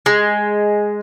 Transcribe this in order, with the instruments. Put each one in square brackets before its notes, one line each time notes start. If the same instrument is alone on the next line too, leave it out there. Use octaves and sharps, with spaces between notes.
[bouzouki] G#3